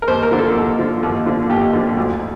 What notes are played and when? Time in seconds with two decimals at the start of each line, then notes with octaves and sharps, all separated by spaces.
0.02 A#4
0.08 D#2 C5
0.23 A#4
0.31 D3 F3
0.38 A4
0.55 D#2
0.79 D3 F3
1.03 D#2
1.26 D3 F3
1.49 D#2 G4
1.73 D3 F3
1.97 D2